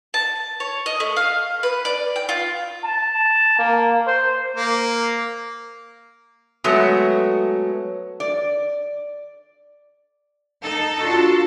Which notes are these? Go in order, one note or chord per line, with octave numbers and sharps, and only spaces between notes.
A5
C#5
D#5
A3
F5
B4
D5
G5
F4
A5
A#3
C5
A#3
F#3 G#3 A3 B3
D5
D#4 A4
D4 F4 F#4